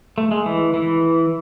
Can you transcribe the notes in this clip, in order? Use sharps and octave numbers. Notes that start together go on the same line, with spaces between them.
A3
G#3
E3
E3